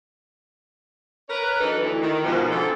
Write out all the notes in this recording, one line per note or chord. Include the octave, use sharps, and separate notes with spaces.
A#4 B4 C#5
E3 F#3 D4 D#4 A4 B4
D2 E3
D#3
G#2 B2 F3
D3 E3 B3 C4 A4